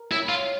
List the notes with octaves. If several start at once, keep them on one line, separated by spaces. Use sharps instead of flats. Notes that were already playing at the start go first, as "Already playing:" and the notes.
Already playing: A#4
E4 G4 C#5
F4